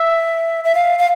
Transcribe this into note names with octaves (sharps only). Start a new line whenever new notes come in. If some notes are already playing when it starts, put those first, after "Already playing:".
Already playing: E5 E6
E5
F5
F5